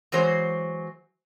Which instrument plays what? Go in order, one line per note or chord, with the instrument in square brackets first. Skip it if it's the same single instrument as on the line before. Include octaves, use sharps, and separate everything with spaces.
[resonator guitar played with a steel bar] E3 F#3 G#3 F#4 C5 C#5